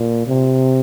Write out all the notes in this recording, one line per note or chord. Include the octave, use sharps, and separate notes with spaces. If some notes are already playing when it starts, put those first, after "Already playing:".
Already playing: A#2
C3